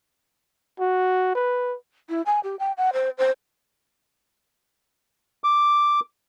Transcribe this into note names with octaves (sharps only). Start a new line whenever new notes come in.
F#4
B4
E4
G#5
G4
G5
F#5
C5
C5
D6